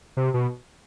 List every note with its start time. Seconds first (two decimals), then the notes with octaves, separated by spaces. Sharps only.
0.17 C3
0.34 B2